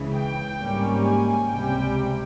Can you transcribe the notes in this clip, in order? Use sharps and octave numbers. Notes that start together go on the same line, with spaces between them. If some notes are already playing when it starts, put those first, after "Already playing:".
Already playing: C#2 C#3 E3
G5
G#1 G#2 G3 A#3 C#4
G#5
C#2 C3 G3 G5